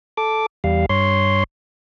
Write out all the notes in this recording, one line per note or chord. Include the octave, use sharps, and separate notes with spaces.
A4 D6
E2 G3 F5
G2 C#5 C6